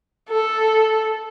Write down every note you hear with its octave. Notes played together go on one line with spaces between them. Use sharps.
A4